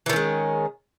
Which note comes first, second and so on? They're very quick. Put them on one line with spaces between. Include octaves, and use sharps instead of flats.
E3 D#3 C#4 G#3